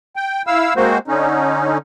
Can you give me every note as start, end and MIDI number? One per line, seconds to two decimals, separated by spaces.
0.16 0.42 79
0.47 0.74 64
0.47 0.74 77
0.47 0.74 88
0.76 0.98 56
0.76 0.98 58
0.76 0.98 60
0.76 0.98 66
0.76 0.98 72
1.08 1.78 50
1.08 1.78 61
1.08 1.78 63